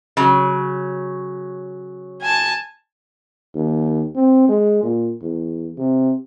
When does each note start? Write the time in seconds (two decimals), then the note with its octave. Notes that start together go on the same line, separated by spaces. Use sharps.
0.17 C#3 F#3
2.21 G#5 A5
3.55 D#2
4.16 C4
4.49 G#3
4.83 A#2
5.22 E2
5.78 C3